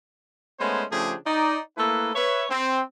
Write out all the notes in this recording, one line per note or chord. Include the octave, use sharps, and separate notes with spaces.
G#3 A3 B3 C#4 B4 C5
C#3 F3 A3 D4 G4 G#4
D#4 D5
A3 A#3 E4 A4 B4
B4 C#5 E5
C4